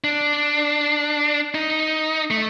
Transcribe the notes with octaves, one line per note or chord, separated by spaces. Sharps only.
D4
D#4
A3